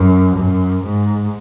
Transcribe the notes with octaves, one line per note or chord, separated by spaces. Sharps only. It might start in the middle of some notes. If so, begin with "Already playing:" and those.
Already playing: F#2
F#2
G#2